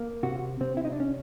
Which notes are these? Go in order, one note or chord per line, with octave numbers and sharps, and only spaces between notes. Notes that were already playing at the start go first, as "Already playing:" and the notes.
Already playing: A#3
C3 F#4
C3 C4
E4
D#4
D4
C#4